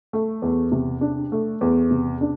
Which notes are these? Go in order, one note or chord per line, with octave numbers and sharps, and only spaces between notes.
A3
E2
C3
D4
A3
E2
C3
D4